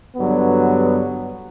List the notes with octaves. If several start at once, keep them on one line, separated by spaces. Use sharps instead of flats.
G2 D3 F#3 B3